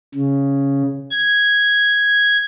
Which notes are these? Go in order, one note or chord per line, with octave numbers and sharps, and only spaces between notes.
C#3
G#6